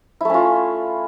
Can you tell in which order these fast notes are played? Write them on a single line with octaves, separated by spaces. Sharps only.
E4 A3 C#4 F4